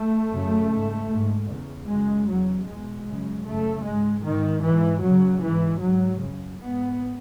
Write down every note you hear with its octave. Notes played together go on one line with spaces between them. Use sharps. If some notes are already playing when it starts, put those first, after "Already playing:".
Already playing: A3
F#2 C#3
G#2
G#2
E2 C#3
F#2 C#3 G#3
E2 C#3 F#3
E2 B2 G#3
F#2 C#3
F#2 C#3 A3
G#2 G#3
G#2 D#3
G#2 E3
F#2 C#3 F#3
G#2 E3
G#2 F#3
F#2 C#3
G#2 B3